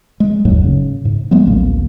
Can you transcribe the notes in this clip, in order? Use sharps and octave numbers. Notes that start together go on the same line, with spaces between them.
G#3
F#1 D#2 G#2 F#3
C#3
G#2
F#3 G#3 A#3 B3
A1 D2 A#3